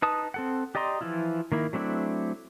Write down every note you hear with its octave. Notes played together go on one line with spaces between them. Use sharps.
D#4 B4 A5 D#6
C4 A4 F#5
G4 D5 D#5 A#5 C6
E3 F3 E4 F4
D#3 A#3 E4
F#3 A3 C4 D4 E4